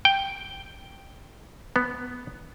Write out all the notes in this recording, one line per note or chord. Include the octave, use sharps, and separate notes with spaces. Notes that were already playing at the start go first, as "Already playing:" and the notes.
G5
B3